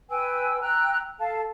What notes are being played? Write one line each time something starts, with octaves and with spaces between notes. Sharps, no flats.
B4 G5 G#5 E6
G5 A#5 E6 F#6
A4 F5 A5